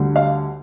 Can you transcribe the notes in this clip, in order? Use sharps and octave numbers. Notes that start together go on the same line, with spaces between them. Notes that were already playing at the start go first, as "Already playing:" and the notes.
Already playing: D2 D3 G3
F5